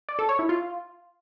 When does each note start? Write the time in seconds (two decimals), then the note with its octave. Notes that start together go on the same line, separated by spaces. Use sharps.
0.09 D5
0.19 A4
0.29 C#5
0.39 E4
0.49 F4